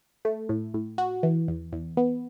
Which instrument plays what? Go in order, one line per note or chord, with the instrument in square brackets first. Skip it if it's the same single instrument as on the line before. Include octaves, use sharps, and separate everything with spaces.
[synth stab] A3
A2
A2
F#4
E3
E2
E2
B3